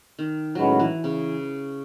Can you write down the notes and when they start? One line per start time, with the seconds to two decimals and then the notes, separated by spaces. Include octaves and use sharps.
0.19 D#3
0.55 A2 F#3 G#3 C#4 F#4 B4
0.79 E3
1.04 C#3